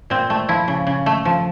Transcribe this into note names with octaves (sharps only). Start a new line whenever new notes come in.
A#2 C4
A3
F3 E4
C#3
C#3
A3
F3